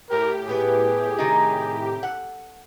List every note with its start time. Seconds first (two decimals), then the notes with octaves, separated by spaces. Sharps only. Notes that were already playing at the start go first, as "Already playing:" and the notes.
0.10 A2 G4 A#4
0.48 E3 B3 G#4 B4
1.18 C3 D#3 D#4
2.03 A4 F#5